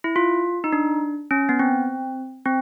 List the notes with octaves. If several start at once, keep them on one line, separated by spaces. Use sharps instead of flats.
E4
F4
D#4
D4
C#4
B3
C4
C4